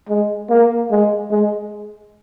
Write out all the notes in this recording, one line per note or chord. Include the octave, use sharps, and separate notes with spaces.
G#3
A#3
G#3
G#3